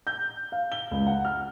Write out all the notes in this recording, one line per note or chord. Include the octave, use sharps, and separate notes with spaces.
G6
F5
G7
C#2
F#5
F6